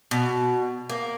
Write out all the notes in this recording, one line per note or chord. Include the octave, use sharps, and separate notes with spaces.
B2
A#3